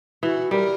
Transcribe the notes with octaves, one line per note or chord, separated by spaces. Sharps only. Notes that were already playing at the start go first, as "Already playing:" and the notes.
E3 F#4
G3 A#4